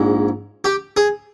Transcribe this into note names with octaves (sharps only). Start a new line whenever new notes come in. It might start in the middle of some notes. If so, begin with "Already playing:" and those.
Already playing: A#1 G#2 G#3
G4
G#4